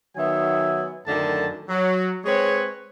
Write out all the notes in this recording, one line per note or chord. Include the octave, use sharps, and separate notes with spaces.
D#3 F#3 B3 E5 G#5
F#2 A2 D3 D#3 A5
F#3
G#3 C4 B4 C#5